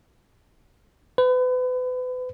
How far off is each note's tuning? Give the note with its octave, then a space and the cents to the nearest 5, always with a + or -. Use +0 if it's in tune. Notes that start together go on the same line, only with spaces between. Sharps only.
B4 +35